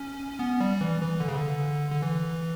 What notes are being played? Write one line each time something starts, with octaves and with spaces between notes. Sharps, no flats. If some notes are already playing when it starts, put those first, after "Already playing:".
Already playing: C#4
B3
G3
E3
E3
D3
C#3
D3
D3
E3